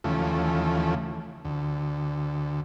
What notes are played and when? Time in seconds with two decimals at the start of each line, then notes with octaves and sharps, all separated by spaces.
0.04 D#2 C#3 E3 F3 A3
1.45 D2